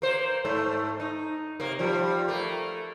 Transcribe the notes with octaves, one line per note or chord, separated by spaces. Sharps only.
A#3 C5
G#2 A3
D#4
C3 A#3
F3 G3
A3 A#3